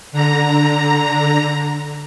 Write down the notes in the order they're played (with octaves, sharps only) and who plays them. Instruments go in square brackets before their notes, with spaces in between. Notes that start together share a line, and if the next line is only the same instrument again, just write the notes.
[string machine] D3 A#5